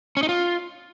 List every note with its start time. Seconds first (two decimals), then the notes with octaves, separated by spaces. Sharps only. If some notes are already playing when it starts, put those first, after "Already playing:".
0.17 C#4
0.23 D#4
0.29 F4